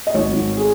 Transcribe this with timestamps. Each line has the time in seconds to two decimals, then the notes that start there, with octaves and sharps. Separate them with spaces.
0.07 D#5
0.14 G#1 C#5
0.32 G#1
0.57 G#4